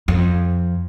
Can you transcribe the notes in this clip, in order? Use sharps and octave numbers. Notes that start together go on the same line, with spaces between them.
F2